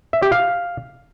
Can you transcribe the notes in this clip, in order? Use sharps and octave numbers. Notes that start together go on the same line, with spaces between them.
E5
G4
F5